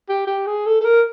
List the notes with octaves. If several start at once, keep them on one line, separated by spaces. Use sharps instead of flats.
G4
G4
G#4
A4
A4
A#4